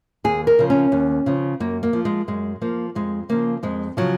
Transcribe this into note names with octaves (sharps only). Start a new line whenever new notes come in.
D#2 G#4
A#4
C#3 F3
C#4
D#2
C#3 F3
F#2 A#3
A#3
F3
G#3
F#2 G#3
F3 A#3
F2 G#3
C#3 F3 A#3
F2 G#3
C#3 F3 F#3